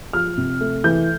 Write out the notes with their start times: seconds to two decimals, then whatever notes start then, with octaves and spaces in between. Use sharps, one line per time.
0.13 F3 F6
0.38 C3
0.61 A3
0.84 E3 G6